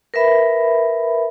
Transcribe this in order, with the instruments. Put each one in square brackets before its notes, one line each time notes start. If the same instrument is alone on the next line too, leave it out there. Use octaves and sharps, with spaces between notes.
[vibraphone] A#4 B4 E5 B5